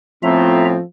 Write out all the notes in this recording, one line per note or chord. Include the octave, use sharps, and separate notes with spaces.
A2 F3 A3 B3 C4 F4 E5 A#5